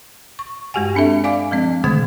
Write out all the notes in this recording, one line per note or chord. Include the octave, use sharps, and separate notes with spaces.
C#6
G2 G#3 F#4 G4 F#5 G#5
C4 D4 A4 E5
D5 F5 G#5 D6
F3 G#3 C4
B2 D3 D#3 A3 G#6